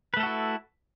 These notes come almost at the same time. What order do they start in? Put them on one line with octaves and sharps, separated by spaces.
B4 A3 A4 F#4 E4